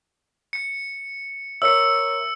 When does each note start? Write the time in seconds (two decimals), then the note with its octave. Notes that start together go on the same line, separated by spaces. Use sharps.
0.53 C#7
1.62 A#4 C#5 E5 E6 C#7